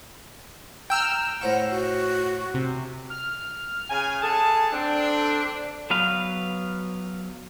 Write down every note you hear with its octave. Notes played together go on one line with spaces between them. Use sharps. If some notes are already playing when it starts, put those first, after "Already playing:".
G5 A#5 E6 F6
A2 C5 F#5 C#6
F#4
C3
F6
C#3 G#5
G#4 A4 F#5 A5
C4 D4
F#3 B3 B4 F5